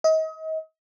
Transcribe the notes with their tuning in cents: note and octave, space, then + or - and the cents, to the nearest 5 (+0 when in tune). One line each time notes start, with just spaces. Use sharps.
D#5 +35